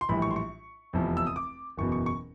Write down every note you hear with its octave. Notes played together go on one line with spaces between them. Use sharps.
C6
A#1 A2 E3 G3 B5
C#6
C6
C#6
F1 E2 C3 F3
E6
D#6
D6
F#1 E2 B2 C#6
C#6
C#6